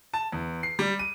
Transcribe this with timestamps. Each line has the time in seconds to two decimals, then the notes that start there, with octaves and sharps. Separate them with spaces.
0.14 A5
0.32 E2
0.63 C7
0.79 G3
0.99 D#7